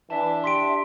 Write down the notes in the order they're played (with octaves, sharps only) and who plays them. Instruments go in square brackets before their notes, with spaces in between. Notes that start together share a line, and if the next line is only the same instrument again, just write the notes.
[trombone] E3 [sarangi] D4 [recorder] E5 [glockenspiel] A5
[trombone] G4 [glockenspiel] C6 B6 D7